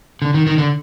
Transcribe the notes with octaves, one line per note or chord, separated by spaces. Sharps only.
D3
D#3
D#3
D3